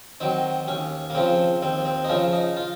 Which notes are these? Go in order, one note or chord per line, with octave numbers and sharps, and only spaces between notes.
D#3 F#3 C4
D#2 C#4
A#3
C#3 F3 C4
D#2 C4
C4
D#4
C#3 F3 C#4
D#4
F4